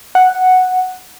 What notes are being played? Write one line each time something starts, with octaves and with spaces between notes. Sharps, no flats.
F#5